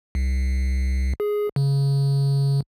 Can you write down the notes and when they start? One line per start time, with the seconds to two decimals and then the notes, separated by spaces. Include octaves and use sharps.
0.15 C2
1.20 G#4
1.56 C#3